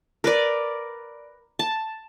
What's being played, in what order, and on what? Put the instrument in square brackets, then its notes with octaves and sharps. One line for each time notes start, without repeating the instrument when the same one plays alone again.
[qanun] A#4 B4 D5
A5